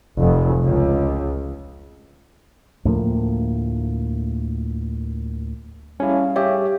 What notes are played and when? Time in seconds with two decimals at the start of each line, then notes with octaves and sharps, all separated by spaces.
0.19 F1
0.64 C#2
2.85 D2 A2 F3 A#3
6.00 G3 C#4 E4 G#4 F5
6.36 G4 C#5 E5